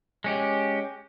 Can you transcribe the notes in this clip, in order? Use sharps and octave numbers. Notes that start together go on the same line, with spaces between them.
G#3 C#4 G4